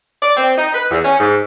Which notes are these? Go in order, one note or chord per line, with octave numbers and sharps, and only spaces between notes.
D5
C4
D#4
B4
E2
C#4
G#2